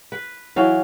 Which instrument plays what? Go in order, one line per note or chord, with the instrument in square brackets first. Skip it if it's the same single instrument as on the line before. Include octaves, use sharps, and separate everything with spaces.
[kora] B4
E3 F#3 F5